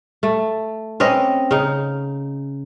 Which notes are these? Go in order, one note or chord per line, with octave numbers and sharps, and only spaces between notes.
A3
C4 C#4 B4 D#5
C#3 D#4